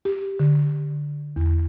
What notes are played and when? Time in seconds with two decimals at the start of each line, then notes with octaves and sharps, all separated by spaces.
0.05 G4
0.39 D3
1.36 E2